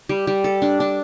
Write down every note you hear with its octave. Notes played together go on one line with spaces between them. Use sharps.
G3
G3
A4
D4
D4